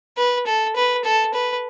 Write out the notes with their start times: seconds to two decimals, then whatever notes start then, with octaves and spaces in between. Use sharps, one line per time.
0.18 B4
0.47 A4
0.76 B4
1.05 A4
1.34 B4